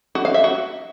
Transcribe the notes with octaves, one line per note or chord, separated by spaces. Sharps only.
F#4
F5
E5
F#4